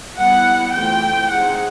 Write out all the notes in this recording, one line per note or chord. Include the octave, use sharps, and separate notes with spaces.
G3 B3 E4 F#5
E3 A3 C4 F4 G5
G#3 C4 D#4 F#5